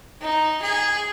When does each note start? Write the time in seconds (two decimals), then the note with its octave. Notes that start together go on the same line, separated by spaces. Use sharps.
0.21 D#4
0.62 G#4